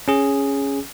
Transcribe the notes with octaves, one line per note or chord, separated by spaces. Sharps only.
C#4 G#4